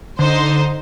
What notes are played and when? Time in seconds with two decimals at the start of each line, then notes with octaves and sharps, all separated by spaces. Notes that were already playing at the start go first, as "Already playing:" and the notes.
0.19 D3 D#4 C5